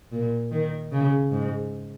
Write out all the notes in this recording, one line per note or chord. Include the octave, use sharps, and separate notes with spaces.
A#2
D#3
C#3
G#2